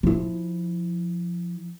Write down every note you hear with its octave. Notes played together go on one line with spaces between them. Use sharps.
F3 E4